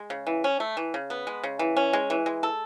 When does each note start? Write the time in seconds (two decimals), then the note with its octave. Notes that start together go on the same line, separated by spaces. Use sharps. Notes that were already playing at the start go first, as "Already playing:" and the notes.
Already playing: G#3
0.10 C#3
0.27 E3
0.44 C#4
0.60 A3
0.77 E3
0.94 C#3
1.10 B3
1.27 G#3
1.43 C#3
1.59 E3
1.77 C#4
1.93 G#3
2.10 E3
2.26 G#3
2.43 A4